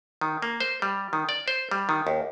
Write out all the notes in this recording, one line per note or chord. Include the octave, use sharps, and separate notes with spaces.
D#3
A#3
C5
G3
D#3
D5
C5
G3
D#3
D#2